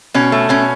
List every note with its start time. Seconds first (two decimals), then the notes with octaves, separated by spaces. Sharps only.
0.14 B2 C#4
0.32 A3
0.49 B2 C#4